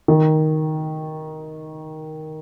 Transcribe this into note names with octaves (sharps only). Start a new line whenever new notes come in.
D#3